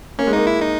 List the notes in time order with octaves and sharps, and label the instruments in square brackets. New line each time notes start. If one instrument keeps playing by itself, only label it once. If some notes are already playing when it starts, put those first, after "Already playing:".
[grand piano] A#3 [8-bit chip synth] C#4
[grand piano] G#3
[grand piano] A#3 [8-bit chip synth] D#4
[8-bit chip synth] E4
D#4